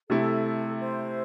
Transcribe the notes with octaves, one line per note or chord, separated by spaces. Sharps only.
C3 A3 E4 A4
C5